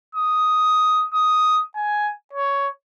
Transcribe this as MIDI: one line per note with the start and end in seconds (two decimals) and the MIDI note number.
0.15 1.05 87
1.14 1.61 87
1.76 2.10 80
2.33 2.68 73